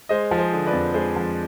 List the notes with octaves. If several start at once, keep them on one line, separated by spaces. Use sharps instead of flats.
G#3 C5 D#5
F3
G#4 C5
D3
B4 D5
F2
G#3 G#4 C5
F3